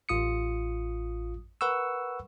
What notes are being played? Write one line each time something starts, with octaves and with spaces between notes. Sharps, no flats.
A1 F4 D#6 C#7
A#4 B4 F#5 C#6 E6